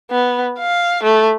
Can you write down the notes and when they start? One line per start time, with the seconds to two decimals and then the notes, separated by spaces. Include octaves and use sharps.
0.11 B3
0.59 F5
1.03 A3